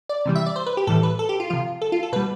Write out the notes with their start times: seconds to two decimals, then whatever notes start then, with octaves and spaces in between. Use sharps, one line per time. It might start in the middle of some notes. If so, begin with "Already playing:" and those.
0.09 D5
0.25 C3 E3 G3
0.36 E5
0.46 D5
0.56 C5
0.66 B4
0.77 G4
0.87 A2 E3 G3 A4
1.03 B4
1.19 A4
1.29 G4
1.40 F4
1.50 C3 F3 F4
1.82 A4
1.92 F4
2.03 A4
2.12 B2 G3 B4